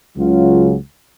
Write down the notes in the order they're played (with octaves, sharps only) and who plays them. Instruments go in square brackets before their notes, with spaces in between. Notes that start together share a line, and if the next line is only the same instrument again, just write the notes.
[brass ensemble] C#2 C#3 F#3 F4